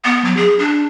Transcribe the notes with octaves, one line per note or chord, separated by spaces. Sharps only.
B3
F#3
G#4
D4